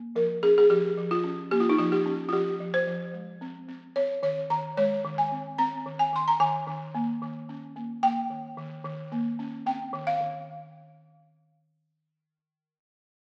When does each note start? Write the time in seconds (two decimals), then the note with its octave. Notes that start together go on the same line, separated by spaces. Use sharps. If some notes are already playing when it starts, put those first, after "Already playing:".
Already playing: A#3
0.16 F3 A#4
0.43 C#4 G#4
0.58 G#4
0.70 F3 G4
0.97 F3
1.11 F4
1.24 C#4
1.51 A#3 G4
1.60 F4
1.69 D#4
1.78 F3 F4
1.92 G4
2.06 C#4
2.29 F4
2.33 F3 G4
2.60 F3
2.74 C5
2.87 F3
3.14 G#3
3.41 C4
3.68 C4
3.96 C4 C#5
4.23 D#3 C#5
4.50 D#3 A#5
4.77 G#3 C#5
5.04 D#3
5.18 G#5
5.32 C4
5.58 C4 A#5
5.86 D#3
5.99 G#5
6.13 D#3 C6
6.28 A#5
6.40 D#3 G#5
6.67 D#3
6.95 A#3
7.22 D#3
7.49 C#4
7.76 A#3
8.03 A#3 G5
8.30 D#3
8.57 D#3
8.85 D#3
9.12 A#3
9.39 C#4
9.66 C4 G5
9.93 D#3
10.07 F5
10.21 D#3